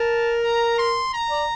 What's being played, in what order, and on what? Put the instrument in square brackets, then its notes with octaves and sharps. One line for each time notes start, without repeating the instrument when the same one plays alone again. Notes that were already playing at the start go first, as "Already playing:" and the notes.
Already playing: [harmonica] A#4 [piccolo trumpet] A5
[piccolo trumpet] A#5
C6
A#5
[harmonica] D5